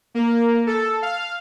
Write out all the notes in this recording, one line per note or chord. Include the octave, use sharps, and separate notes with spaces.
A#3
A4
F5